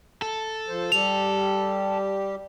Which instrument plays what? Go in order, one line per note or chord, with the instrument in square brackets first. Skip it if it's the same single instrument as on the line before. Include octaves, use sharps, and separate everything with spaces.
[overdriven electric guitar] A4
[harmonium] F3 C5
[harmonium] G3 G4 [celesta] F7